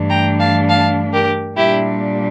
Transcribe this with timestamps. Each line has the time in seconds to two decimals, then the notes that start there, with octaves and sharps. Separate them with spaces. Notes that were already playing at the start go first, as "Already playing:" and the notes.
Already playing: G2 E3 A3 D4
0.09 G5 A#5
0.39 F5 A5
0.68 F5 A5
1.12 G4 A#4
1.56 A#2 G3 D4 E4 G4